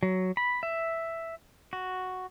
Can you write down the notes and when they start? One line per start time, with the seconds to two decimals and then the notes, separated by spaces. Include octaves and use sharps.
0.03 F#3
0.37 B5
0.63 E5
1.73 F#4